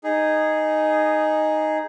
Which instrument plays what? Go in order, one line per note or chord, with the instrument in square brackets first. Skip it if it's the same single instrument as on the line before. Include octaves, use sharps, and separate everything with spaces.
[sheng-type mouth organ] D#4 G#4